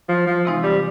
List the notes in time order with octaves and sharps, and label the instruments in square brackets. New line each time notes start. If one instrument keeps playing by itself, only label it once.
[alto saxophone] F3
F3
[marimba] C3 E3 G#3 C4 D#4
[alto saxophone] G3